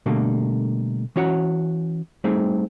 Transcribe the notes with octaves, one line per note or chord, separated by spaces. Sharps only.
B2 D3 G3 A3 A#3
E3 C#4 F#4 C#5 F#5
G3 A3 C4 D#4 G#4